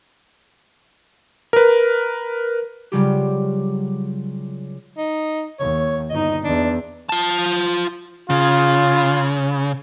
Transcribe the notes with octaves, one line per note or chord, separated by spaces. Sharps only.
A#4 B4
C#3 F#3 G3 F4 G4
D#4
D#2 C#5
G1 D#4 D#5
E2 D4
F4 A5
C#3 F4